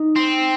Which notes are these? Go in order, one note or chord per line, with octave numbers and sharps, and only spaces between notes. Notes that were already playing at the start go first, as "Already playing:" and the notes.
Already playing: D#4
C4